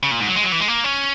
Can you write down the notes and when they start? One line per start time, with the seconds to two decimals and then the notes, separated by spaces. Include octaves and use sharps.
0.03 C#3
0.11 A#2
0.20 G#2
0.27 F#3
0.36 G#3
0.43 F#3
0.52 E3
0.60 G#3
0.68 A#3
0.84 C#4